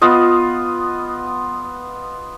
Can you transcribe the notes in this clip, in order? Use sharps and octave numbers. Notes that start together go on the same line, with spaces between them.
B3 F4 D#5